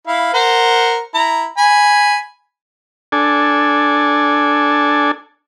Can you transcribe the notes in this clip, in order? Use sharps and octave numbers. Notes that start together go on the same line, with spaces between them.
E4 F5
A#4 C5 F#5
E4 A#5
G#5 B5
D4 A4 G#5